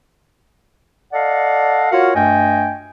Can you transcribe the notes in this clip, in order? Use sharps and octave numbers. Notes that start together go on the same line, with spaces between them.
A4 D5 D#5 F5 F#5
F4 F#4 A#4 C#5 F5 F#5
G2 A3 D#5 G5 G#5